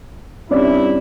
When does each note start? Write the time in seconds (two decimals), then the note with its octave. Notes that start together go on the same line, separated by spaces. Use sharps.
0.51 G2 C4 C#4 E4 D5